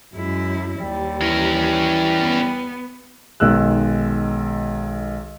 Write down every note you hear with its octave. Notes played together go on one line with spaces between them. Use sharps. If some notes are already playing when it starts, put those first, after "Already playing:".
F#2 G#3 E4
D#2 G3
E3 C#4 A#4
B3
B1 D#3 G#3 E6 F#6